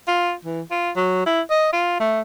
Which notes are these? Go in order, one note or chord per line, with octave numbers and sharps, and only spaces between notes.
F4
E3
F4
F#3
E4
D#5
F4
A3